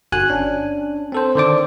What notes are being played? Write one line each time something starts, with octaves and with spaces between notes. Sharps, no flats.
G1 F#4 G#5 F#6
C#4 D4
C4 A4 C5
D3 D#3 C5 D5 D6